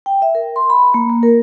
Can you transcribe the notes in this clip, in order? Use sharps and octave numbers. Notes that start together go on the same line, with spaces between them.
G5
E5
A#4
C6
B5
A#3
A#3
A#4